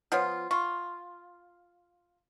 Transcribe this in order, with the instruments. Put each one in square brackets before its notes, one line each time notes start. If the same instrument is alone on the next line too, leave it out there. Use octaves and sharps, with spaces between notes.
[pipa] F3 B3 F4 [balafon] C#5 F#5
[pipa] F4 [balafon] C#6